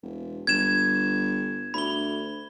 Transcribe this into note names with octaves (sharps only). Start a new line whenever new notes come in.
E1
G1 G#6 E7
D2 B5 G7